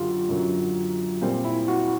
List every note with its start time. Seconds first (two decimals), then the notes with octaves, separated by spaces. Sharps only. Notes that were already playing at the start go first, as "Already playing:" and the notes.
Already playing: F#2 D3 F#3 F4 G4
0.29 F#2 D3 F#3
1.21 A#2 G3 C4
1.45 E4
1.68 F#4